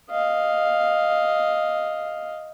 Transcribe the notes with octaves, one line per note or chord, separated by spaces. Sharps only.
D#5 F5